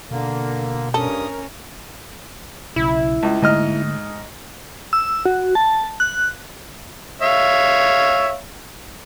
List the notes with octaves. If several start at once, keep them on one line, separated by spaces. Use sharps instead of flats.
B2 D3 A#3
G2 C#4 A4 A#4 D#6
B1 C#3 E4
C#2
G#2 D3 A3 A#3 D#5 F6
E6
F#4
A5
F#6
C#5 E5 F5